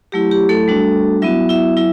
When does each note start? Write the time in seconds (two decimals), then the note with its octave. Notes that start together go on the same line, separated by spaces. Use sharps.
0.12 F#3 A3 E4 G4
0.31 G4
0.49 A3 A4
0.68 G3 D4 F#4
1.22 F#3 B3 E4 F#4 E5
1.49 E4 E5
1.77 F#3 E4 E5